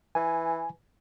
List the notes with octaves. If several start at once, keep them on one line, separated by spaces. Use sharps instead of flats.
E3 G#5